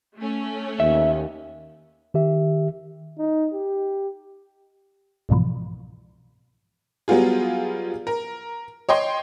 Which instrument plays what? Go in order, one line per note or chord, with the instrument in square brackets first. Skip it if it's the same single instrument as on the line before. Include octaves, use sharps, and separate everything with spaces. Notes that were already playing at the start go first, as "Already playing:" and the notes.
[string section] A3 C#4
[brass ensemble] D#2 [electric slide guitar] E5
[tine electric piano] D#3 G4 E5
[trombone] D#4
G4
[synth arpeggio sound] C2 G#2 B2 E3 F3
[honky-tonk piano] F#3 G3 B3 F4 G#4
A#4
C#5 D#5 G5 C6